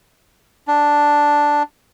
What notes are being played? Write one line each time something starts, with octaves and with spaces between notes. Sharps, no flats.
D4